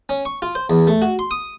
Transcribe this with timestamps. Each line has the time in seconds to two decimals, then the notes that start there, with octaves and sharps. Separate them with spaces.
0.09 C#4
0.25 C#6
0.42 F4
0.55 C5
0.70 E2
0.87 A3
1.02 F#4
1.19 C6
1.31 D#6